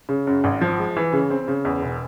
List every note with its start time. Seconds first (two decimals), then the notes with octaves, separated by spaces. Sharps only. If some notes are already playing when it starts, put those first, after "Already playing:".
0.09 C#3
0.27 F#2
0.44 G#1
0.61 F3
0.78 G#3
0.97 E3
1.13 C#3
1.30 C4
1.48 C#3
1.65 E2
1.82 E1